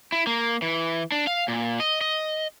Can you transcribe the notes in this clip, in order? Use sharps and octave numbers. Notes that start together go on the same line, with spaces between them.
E4
A#3
E3
D4
F5
A#2
D#5
D#5